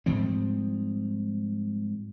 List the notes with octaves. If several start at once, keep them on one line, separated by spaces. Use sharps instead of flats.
G#2 F3 G3 C4